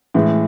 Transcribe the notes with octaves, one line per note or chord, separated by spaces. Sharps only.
A2 E3 G#3